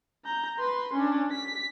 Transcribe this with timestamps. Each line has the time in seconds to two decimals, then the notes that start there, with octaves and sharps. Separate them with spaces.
0.25 A#5 G6
0.59 B4 C6
0.94 C#4 D4
1.31 B6